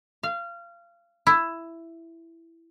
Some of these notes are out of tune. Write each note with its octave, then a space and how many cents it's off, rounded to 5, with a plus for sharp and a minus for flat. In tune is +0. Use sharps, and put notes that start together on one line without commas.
F5 -25
E4 +10